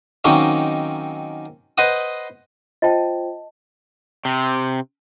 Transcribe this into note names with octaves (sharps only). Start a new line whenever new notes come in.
D#3 F#3 A#3 C4 C#4 D#4
B4 C5 D#5 F#5 D#6
F4 C5 D#5 G5 A5
C3